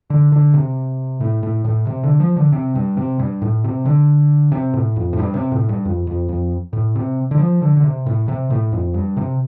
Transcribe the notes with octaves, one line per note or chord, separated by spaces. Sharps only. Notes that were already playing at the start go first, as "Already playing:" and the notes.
D3
D3
C3
A2
A2
A2
C3
D3
F3
D3
C3
G2
C3
G2
A2
C3
D3
C3
A2
F2
A2
G2
C3
A2
G2
F2
F2
F2
A2
C3
D3
F3
D3
D3
C3
A2
C3
A2
F2
G2
C3